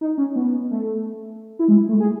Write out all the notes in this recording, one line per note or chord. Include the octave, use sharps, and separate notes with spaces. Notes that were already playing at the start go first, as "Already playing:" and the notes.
D#4
C#4
B3
A3
E4
G#3
A3
G#4